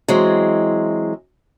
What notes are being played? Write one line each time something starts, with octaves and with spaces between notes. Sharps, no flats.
E3 F#3 G#3 C4